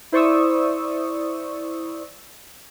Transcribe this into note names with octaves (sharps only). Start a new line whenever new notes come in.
E4 C5 D5 C#6 D#6 E6